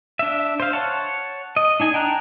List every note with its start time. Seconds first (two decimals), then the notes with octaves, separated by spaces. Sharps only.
0.19 D4 E5
0.60 C5 F5
0.73 C#5 F#5 A5
1.57 D#5
1.80 D4 D#4 G#5
1.94 G5 A5 A#5 F#6